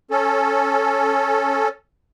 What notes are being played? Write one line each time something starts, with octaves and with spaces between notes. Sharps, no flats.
C#4 A4